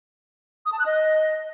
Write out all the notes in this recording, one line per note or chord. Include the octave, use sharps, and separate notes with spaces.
D#6
A5
F#6
D#5